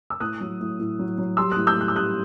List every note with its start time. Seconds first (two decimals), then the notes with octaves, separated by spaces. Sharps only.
0.10 E6
0.20 A2 D#6 F#6
0.41 F#3
0.60 A2
0.79 A2
0.99 F#3
1.18 F#3
1.37 G3 C6 E6
1.52 A2 D#6 F#6
1.67 E6 G6
1.76 A2 F#6
1.88 E6
1.96 G3 D#6 F#6